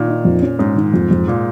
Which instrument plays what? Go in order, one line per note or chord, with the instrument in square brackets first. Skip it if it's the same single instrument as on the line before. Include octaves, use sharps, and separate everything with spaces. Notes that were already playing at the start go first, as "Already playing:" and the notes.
Already playing: [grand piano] A#2 D#3
[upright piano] D#4
F2
C#4
[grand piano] G#2 [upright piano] C#4
[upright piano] D#3
F2
F2
[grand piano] A#2